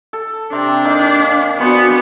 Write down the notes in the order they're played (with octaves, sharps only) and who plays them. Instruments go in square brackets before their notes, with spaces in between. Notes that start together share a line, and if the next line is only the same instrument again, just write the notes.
[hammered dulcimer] A4
[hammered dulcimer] C3 C4 A#5 [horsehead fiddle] D4
[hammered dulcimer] A#3 D#4
[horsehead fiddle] B3 F#4 [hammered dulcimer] D4 C5 G#5